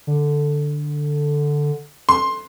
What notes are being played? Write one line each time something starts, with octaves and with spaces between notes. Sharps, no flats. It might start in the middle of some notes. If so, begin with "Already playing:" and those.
D3
C6